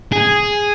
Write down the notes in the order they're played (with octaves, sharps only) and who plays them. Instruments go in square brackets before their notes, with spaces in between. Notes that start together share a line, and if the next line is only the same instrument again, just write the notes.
[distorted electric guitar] G#4